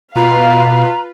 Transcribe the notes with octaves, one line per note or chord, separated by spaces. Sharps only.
B2 F4 B4 F5 A#5